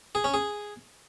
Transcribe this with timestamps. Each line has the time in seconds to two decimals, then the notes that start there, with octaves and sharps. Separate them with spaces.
0.15 G#4
0.24 C#4
0.34 G#4